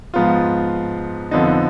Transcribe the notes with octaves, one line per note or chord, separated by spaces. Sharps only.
G#2 F3 B3 F4
F2 D3 F3 B3 D#4